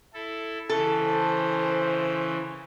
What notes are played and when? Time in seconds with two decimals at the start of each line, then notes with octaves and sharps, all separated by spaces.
0.14 E4 A4
0.69 C#3 E3 A4
1.04 C5